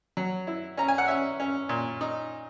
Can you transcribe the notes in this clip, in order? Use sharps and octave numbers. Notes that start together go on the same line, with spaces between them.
F#3
E4
C#4 A#5
G#5
F#5
C#4 E5
C#4
A#2
D#4